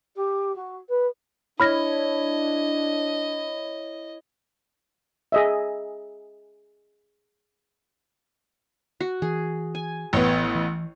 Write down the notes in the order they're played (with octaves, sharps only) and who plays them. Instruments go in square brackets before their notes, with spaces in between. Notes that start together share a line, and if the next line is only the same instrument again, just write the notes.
[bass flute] G4
F#4
B4
[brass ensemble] D4 [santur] E4 C#5 [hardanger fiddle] D#5 [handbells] B5 F6 A#6
[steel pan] G#4 D#5 E5
[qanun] F#4
[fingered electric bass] E3 [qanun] G#4
[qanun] G#5
[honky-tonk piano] A1 B3 [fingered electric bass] E3 [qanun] C#5 G5
[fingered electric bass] E3